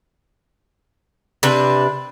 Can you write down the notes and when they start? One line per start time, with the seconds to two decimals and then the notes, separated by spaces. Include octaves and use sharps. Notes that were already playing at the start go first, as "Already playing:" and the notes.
1.43 C3 D4 B4